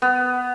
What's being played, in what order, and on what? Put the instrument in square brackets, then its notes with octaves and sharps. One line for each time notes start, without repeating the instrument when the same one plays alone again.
[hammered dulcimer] B3